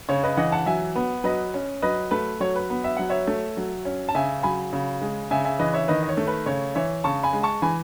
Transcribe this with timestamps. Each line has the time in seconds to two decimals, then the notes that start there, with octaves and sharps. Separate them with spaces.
0.09 C#3 C#5
0.24 B4 D#5
0.37 E3 D#5 F#5
0.52 F#5 A5
0.66 F#3 E5 G#5
0.96 B3
1.24 F#3 B4 D#5
1.54 C#4
1.82 F#3 B4 D#5
2.11 A3 B4
2.40 F#3 C#5
2.56 B4
2.70 B3
2.84 E5
2.97 F#3 F#5
3.09 C#5 E5
3.27 A3
3.57 F#3
3.85 C#4
4.09 A5
4.15 C#3 E5 G#5
4.43 F#3 G#5 B5
4.73 C#3
5.02 G#3
5.31 C#3 E5 G#5
5.44 E5 G#5
5.59 E3 B4 D#5
5.74 C#5 E5
5.88 D#3 B4 D#5
6.03 D#5
6.09 C#5
6.17 A3
6.27 B4
6.46 C#3 C#5
6.75 E3 C#5 E5
7.04 C#3 A5 C#6
7.23 G#5 B5
7.33 G#3
7.43 A5 C#6
7.62 E3 G#5 B5